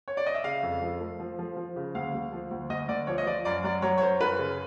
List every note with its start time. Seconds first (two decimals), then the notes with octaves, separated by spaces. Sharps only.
0.08 C#5
0.17 D5
0.26 D#5
0.35 E5
0.44 C#3 F5
0.63 F2
0.82 F3
1.01 A3
1.20 F3
1.39 F3
1.56 F3
1.76 C#3
1.95 D2 F5
2.14 D2
2.32 F3
2.51 D2
2.69 D2 D#5
2.88 D2 D5
3.07 F3 C#5
3.18 D#5
3.26 F3 D5
3.45 F#2 D5
3.64 F#3 D5
3.82 F#3 C#5
3.98 C#5
4.02 F#2 C5
4.21 F#2 B4
4.39 C#3